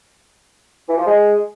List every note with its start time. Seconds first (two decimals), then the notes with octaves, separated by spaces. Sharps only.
0.88 E3
0.96 F3
1.05 G#3